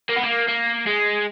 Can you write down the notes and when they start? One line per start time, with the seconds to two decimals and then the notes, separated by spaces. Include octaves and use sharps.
0.09 A#3
0.16 B3
0.23 A#3
0.48 A#3
0.86 G#3